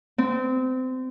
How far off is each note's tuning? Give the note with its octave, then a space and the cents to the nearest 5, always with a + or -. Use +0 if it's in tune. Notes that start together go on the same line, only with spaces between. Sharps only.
C4 -25